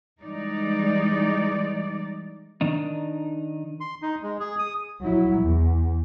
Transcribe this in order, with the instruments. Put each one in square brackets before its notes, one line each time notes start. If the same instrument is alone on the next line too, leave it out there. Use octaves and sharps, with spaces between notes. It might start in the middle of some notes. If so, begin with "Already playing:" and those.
[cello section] E3 G3 G#3 D#4 D5
[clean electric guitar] D#3 D4 D#4
[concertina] C6
D#4
G#3
G#4
D#6
[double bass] F#3 E4
E2